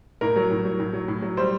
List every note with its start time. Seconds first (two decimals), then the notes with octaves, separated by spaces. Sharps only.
0.21 A2 A#4
0.36 F#3
0.51 A2
0.65 F#3
0.80 A2
0.93 F#3
1.08 A2
1.22 F#3
1.37 G3 C5